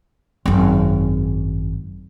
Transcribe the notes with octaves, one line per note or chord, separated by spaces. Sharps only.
G#1 F#2